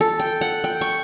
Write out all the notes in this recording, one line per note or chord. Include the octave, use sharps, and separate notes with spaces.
A4
G5
F#5
G5
C#6